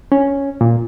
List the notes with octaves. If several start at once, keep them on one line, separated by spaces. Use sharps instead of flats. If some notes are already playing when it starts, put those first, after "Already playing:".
C#4
A#2